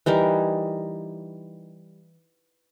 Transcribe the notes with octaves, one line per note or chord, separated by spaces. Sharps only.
E3 G3 D#4 A#4